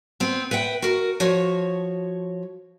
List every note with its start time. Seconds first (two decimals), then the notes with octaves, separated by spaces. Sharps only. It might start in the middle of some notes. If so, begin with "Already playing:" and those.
0.20 B3 C4
0.51 B4 E5 F#5 G5
0.82 F#4 A#4
1.20 F3 F#4 C#5